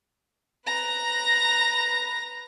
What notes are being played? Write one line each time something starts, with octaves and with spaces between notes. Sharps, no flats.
B4 A#5